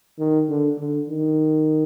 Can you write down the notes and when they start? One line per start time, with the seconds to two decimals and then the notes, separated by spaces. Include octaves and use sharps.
0.19 D#3
0.49 D3
0.78 D3
1.09 D#3